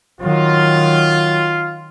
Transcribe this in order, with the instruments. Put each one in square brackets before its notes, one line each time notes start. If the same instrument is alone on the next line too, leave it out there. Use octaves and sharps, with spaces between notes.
[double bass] D#3 F#3 [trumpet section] F4